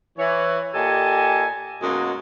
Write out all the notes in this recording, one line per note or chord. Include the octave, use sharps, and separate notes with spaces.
E3 C#5
A#2 G4 A4 D#5 G#5
F#2 B2 G#3 A#3 D#4 F#4